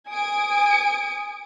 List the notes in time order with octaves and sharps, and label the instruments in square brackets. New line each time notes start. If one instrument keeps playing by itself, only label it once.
[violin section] G#5 D#6 D7